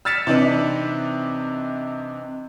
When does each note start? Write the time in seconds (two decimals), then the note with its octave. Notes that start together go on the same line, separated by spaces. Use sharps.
0.05 E6 F6 A6 B6 C#7 E7
0.27 C3 E3 D4 D#4 B4